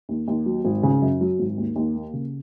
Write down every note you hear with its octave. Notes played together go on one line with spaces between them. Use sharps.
D#2
D#2
F#3
G#1
C#3
F#2
F#3
G#1
D#2
D#2
A#3
C#3